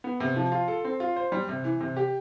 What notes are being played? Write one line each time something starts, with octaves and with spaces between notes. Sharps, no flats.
B3
C3
F3
F4
A4
C4
F4
C5
G3
C3
E3
C3
G4